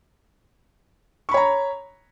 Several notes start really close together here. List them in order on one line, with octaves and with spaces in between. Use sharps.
C#6 B5 C#5 A#5